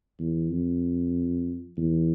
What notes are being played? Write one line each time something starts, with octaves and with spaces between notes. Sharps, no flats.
E2
F2
E2